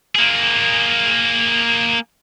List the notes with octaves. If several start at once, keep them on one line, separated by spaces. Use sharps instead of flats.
A#3 G#4